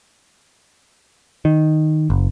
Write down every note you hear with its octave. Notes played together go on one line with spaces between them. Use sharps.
D#3
F#1